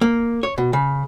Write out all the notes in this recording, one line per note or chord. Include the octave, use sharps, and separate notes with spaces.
A#3
C#5
B2
C#3